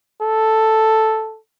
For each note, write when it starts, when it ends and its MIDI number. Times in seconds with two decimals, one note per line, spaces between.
0.22 1.39 69